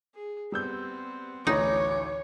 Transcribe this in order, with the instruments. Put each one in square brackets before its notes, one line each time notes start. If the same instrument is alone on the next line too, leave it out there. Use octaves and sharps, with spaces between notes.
[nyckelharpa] G#4
[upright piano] G3 E6 G6 [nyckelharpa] B3 C4
[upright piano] A1 D2 E3 [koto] D#4 [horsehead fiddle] C#5 [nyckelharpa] D6